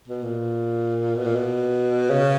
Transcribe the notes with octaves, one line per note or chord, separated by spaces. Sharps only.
B2
A#2
B2
A#2
B2
C#3